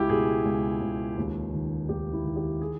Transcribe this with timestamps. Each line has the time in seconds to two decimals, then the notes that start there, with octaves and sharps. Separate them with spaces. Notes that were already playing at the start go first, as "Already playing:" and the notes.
Already playing: C#2 E4 G4
0.09 B2 G#4
0.45 C#2
0.81 C#2
1.17 D#2
1.54 D#3
1.88 D#2 G4
2.13 E4
2.24 D#3
2.36 G4
2.61 G#4